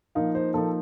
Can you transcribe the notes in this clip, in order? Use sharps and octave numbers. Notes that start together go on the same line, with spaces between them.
F3 A#3 D#4 F5
C5
F3 A#3 D#4 A4